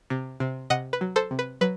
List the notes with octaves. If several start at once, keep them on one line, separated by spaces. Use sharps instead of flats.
C3
C3
C3 D#5 F#5
B4
F#3
A4 C5
C3
B4
F#3 B4